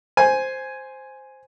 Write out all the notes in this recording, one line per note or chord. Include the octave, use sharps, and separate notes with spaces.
C5 G#5